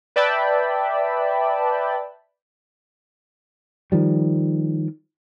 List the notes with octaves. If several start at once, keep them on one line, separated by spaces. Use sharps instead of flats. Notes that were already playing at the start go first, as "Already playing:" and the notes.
B4 D5 E5 G5 A5 B5
D#3 F3 G3